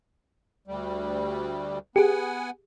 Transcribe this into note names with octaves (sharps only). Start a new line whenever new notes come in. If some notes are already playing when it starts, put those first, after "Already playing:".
D2 G3
B3 G4 G#4 F#5 G#5